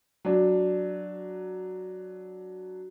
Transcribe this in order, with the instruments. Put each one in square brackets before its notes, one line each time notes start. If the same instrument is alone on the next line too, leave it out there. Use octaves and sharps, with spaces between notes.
[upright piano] F#3 D4